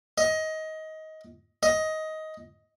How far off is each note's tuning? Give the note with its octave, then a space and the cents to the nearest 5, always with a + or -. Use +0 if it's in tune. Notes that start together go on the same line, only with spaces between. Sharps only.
D#5 +20
D#5 +15